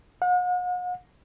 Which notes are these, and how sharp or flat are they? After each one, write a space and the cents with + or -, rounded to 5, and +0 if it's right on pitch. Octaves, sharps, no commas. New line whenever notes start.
F#5 -45